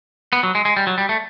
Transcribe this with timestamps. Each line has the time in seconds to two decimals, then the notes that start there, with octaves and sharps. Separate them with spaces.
0.33 B3
0.43 F#3
0.55 G#3
0.65 G#3
0.77 G3
0.87 F#3
0.98 G3
1.09 A3